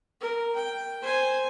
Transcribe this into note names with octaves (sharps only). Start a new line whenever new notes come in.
A#4
G5
C5 G#5